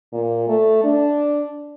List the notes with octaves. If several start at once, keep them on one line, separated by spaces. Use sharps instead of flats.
A#2
A3
D4